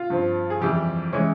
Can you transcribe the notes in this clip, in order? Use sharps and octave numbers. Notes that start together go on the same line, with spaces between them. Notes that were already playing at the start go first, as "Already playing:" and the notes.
Already playing: F4
G2 F3 C4
G#4
F2 E3 G3 G4
E3 G#3 C#4